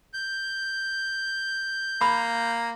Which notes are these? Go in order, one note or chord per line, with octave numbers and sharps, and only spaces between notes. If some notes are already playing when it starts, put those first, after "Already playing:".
G6
A#3 B5